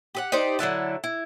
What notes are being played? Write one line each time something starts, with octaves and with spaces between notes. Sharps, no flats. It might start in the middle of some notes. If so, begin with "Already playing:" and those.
G4 G#4 F#5
D#4 G4 C5 D5
D3 F#3 E4 A5
E4